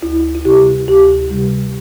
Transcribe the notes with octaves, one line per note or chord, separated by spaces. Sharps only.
D2 E4
E4
C3 G3 G4
D2 G4
C3 G3